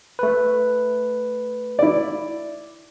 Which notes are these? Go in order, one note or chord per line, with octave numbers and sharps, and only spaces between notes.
A3 B4
E4 D5